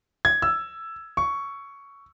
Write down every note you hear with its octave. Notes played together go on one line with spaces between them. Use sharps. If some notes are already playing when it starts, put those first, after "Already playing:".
G#6
E6
C#6